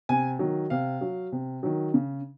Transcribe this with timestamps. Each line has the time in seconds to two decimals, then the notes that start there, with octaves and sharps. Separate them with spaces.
0.09 C3 G#5
0.39 D#3 F#3
0.70 C3 F5
1.01 F#3
1.32 C3
1.63 D#3 F#3
1.94 C#3